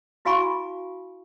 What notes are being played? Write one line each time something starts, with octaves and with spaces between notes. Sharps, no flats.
E4 F#4 F5 G#5 B5 C#6